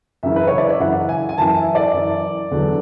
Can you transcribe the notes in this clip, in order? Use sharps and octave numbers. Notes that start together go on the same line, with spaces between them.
F#2 C#3 E3 E5
B4
C#5
D5
E5
F#2 C#3 E3 F#5
G#5
G#5
F#2 E3 A5
E5
D5
F#2 E3
E2 D3 F#3